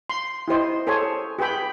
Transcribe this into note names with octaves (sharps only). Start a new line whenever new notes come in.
C6
E4 G4 C5 D#5
G#4 A4 C5 C#5 G#5
G4 G#4 B4 G5 B5